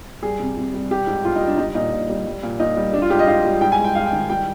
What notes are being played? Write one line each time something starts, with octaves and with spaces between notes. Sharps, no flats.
G3 G#4
C3
C3
G3
G3 G4
G#2
G#2 F4
D#4
G3
D4
G3 D#4
A#2 D#4
A#2
G3
G3
A#2
A#2 D#4
G3
G3 D4
F4
G#2 G4
D#5
G#2 F5
G3
G#2 G5
G#5
G#3
G5
G#2 F5
G5
D#3
G3 G5